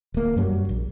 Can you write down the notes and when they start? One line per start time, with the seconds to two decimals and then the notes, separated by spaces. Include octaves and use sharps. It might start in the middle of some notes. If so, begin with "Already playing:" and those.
0.14 D1 A#3
0.37 F#2 F#3 G3
0.69 A#1